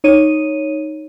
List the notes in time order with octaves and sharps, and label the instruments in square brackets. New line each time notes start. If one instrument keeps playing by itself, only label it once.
[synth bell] D#4 C#5 D#7